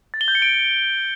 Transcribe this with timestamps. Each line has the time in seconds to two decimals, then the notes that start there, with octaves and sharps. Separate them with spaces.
0.14 A6
0.21 G7
0.28 G6
0.35 C#7
0.42 D7